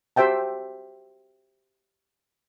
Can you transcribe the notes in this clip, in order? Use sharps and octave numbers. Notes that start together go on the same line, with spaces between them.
F#4 G4 C5 E5 G5 A5